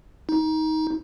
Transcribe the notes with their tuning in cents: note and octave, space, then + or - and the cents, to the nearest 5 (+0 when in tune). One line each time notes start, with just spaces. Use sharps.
D#4 +20